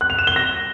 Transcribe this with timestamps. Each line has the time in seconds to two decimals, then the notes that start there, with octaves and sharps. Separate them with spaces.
0.01 F#6
0.10 F7
0.18 E7
0.27 G7
0.36 A#6